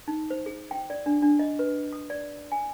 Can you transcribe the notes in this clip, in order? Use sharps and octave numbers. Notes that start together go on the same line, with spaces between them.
D#4
C5
G#4
G5
D5
D4
D4
D#5
B4
D#6
D5
G#5